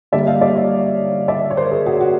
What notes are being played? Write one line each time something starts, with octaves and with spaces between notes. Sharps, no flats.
D3 G3 A#3 D5 E5
D#5 F5
D5 E5
C#5 D#5
D5 E5
C#5
A#4 C5
G#4 A#4
F#4 G#4
F#4